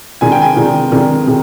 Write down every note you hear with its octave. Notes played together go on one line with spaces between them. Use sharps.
C3 D#3 G#3 D4 G#5
G5
G#5
C3 D#3 G#3 D4
C3 D#3 G#3 D4
C3 D#3 G#3